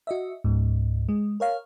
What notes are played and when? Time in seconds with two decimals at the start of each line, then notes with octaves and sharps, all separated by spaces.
0.07 F#4 D#5 E5
0.44 C#2 G#2
1.09 G#3
1.40 A#4 C#5 F5